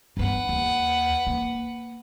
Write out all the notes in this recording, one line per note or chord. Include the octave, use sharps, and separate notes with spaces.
G2 B3 B4 F#5
D#2
A#3